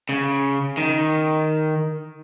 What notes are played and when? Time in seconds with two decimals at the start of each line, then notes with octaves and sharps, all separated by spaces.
0.09 C#3
0.77 D#3